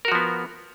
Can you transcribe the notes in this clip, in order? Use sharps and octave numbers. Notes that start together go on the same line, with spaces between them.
F3 B3 F#4 A#4